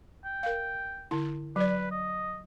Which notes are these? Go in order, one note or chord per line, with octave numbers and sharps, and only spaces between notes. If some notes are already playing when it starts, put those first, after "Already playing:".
G5
A#4 F5
D3 E4
F#3 B4 D5
D#5